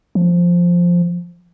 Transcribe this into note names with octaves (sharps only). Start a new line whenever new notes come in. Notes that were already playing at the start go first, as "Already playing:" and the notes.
F3